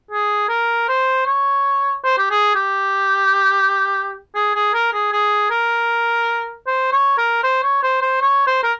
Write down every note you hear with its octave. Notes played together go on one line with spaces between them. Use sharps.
G#4
A#4
C5
C#5
C5
G4
G#4
G4
G#4
G#4
A#4
G#4
G#4
A#4
C5
C#5
A#4
C5
C#5
C5
C5
C#5
C5
A#4